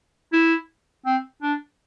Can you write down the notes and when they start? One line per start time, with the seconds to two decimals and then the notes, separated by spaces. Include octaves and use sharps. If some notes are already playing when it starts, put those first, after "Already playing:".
0.33 E4
1.06 C4
1.42 D4